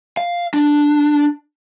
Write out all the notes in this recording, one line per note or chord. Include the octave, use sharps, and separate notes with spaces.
F5
D4